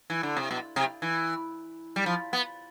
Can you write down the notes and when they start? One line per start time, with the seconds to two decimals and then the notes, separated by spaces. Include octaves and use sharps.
0.10 E3
0.23 D3
0.36 C3
0.51 B2
0.76 C3
1.02 E3
1.96 G3
2.06 F3
2.33 B3